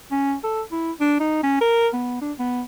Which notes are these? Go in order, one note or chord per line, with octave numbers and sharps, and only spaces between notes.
C#4
A4
E4
D4
D#4
C#4
A#4
B3
D4
B3